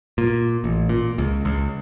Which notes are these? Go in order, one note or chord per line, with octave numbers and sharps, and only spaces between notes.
A#2
A1
A#2
C#2
C#2